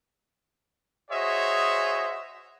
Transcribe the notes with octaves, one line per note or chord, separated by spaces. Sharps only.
F#4 G#4 C5 C#5 D#5 E5